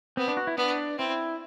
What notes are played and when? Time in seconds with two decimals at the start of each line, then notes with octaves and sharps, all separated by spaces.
0.17 B3 C4
0.28 D4
0.37 F#4
0.47 E4
0.57 B3 D4
0.98 C4 E4